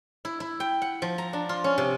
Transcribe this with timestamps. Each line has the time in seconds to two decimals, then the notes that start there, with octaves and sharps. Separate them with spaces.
0.25 E4
0.40 E4
0.60 G5
0.82 F#5
1.02 F3
1.18 A#5
1.33 D4
1.49 F4
1.64 C#4
1.78 C3